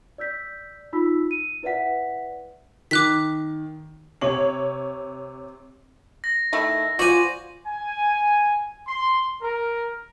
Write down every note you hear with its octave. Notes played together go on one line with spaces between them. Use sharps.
D5 E6 G6 B6
D#4 F4 B5 E6 B6
D#7
E4 B4 D5 E5 F#5 B6
D#3 D6 F#6 B6
C3 C#5 F#7
A#6
D#3 A3 E4
F4 F#4 C5 D5 G#5
G#5
C6
A#4